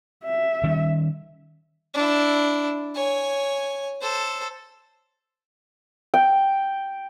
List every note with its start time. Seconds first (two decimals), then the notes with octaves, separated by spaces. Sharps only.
0.24 E5
0.64 D#3 G3 C#4
1.94 D4 E4
2.95 C#5 G#5
4.01 A4 C5
6.14 G5